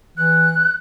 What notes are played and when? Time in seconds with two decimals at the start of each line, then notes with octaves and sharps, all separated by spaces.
0.17 E3 F#6